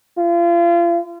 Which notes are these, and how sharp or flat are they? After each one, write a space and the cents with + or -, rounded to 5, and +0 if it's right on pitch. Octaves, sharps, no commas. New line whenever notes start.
F4 -35